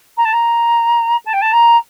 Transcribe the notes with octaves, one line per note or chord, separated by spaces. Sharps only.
A#5
A5
A#5
A5
G5
A5
A#5